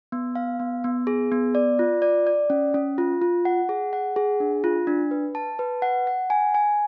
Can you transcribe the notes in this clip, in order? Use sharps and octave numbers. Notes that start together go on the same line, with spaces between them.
B3
F5
B3
B3
G#4
B3
D5
F4
D5
D5
C#4
C#4
F4
F4
F#5
G#4
F#5
G#4
D4
F4
D4
B4
A5
B4
F#5
F#5
G#5
G#5